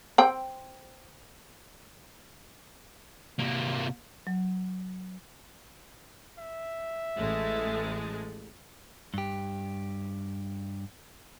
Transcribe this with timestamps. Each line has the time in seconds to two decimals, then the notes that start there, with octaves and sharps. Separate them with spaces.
0.18 C4 G5
3.39 C3 A#3
4.27 F#3
6.38 E5
7.16 A1 G#3 A3
9.14 G2 G4